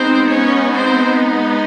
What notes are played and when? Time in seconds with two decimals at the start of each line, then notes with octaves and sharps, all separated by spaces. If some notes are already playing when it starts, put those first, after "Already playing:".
Already playing: G#3 B3 C4 D#4 C5
0.30 C#4 C#5
0.73 C4 C5